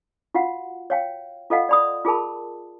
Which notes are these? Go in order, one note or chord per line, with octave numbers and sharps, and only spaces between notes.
F4 F#4 F5 F#5
C#5 F5 G5
F4 A4 D#5 F5 F#5
D5 B5 D#6
F4 G#4 A#4 A5 B5